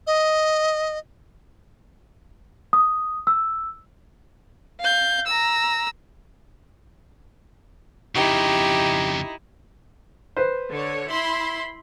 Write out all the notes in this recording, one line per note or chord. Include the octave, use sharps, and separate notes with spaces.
D#5
D#6
E6
F5 G6
A#5 E6
F2 C#3 D#4 E4 G4
B4 C5
D3 C#5
E4 B5 C6